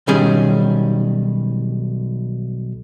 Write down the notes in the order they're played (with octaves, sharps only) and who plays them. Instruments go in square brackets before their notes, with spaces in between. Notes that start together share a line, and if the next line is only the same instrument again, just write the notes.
[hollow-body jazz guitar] B1 D#3 G3 C#4 G#4